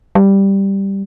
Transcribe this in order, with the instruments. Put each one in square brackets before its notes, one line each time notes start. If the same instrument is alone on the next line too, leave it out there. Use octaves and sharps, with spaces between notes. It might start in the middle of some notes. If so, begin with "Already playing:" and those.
[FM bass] G3